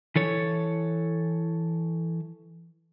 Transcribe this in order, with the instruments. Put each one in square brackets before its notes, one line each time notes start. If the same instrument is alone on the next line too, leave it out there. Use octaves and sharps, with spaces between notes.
[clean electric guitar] E3 A4 C#5